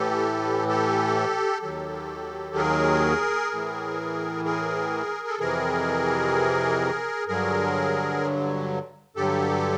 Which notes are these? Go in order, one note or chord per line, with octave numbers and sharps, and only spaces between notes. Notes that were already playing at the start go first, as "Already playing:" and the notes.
Already playing: A2 E3 G4 A4
G4 A4
D#2 D#3 F#3 G4 A4
G#4 A#4
A2 E3
G#4 A#4
A4
F2 C3 E3 G#4 A#4
G2 D3 F#3 G#4 A#4
G2 D3 F#3 G4 A4